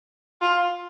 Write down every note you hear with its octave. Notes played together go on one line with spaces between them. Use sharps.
F4